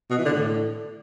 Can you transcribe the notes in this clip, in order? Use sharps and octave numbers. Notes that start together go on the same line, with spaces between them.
B2
E3
D3
A2